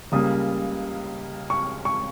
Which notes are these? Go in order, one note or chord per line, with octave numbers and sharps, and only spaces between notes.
C#2 C#3 G3 A#3 D#6
C#6
C#6